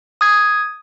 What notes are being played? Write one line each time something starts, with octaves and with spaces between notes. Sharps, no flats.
D#6 G#6